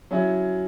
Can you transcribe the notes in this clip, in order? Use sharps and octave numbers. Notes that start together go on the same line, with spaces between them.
F#3 C#4 E4